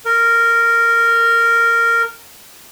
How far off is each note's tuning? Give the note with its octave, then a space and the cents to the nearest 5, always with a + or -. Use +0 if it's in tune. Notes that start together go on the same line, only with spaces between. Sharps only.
A#4 -10